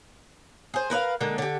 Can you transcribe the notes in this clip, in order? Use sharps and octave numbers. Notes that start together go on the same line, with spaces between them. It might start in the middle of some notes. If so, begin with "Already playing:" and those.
G#4 C5
A#4 B4 D5 F5
D3 G#3 A#3
D3 G4